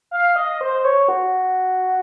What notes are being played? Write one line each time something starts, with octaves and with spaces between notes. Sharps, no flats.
F5
D#5
C5
C#5
F#4